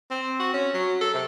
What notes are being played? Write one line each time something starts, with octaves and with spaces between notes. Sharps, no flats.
C4
F#4
C#4
F#3
A4
C3